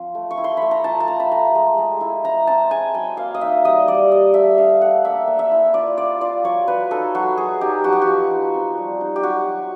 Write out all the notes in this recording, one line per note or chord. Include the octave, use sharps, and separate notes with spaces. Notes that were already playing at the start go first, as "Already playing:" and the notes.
Already playing: F3 C4 F4
A3
C#6
E4
C6
A3 B5
A#5
F4 A5
A5
A3 A#5
B5
A3 A#5
G#3
G#3
E4
G#3 A#5
C4 A5
G#3 G#5
F#3 G5
A#3 F5
D#5
D#4 E5
G3 D#5
G3 D5
G3 D#5
A3 E5
D4 F5
A3 F#5
A#3 E5
A#3
E5
E4
F4 D5
F4 D5
F4 D5
F#3 C#5
F#3 B4
D#4 A4
F#3 F#4
F#3 G#4
D#4 G4
F3 F#4
G4
F#4
F3
D#4
C4
G3
D#4
G4
F#3 F#4
F#3